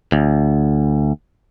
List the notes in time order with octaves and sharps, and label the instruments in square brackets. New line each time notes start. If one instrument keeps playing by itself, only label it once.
[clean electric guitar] D2